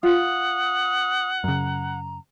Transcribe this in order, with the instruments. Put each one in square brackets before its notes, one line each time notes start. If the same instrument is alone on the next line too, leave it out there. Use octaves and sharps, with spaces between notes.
[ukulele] F4 [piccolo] F#5 [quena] D#6
[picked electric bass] F#2 C#3 [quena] A#5